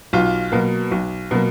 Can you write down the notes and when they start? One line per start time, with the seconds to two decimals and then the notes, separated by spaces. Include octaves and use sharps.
0.13 B1 F4
0.52 B2 F#3 A#3
0.91 B1
1.31 B2 F#3 A#3